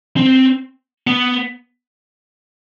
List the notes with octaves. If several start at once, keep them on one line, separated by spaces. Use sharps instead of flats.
C4
B3